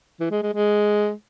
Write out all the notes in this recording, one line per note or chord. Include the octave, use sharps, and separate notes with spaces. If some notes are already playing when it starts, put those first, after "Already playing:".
E3
G#3
G#3
G#3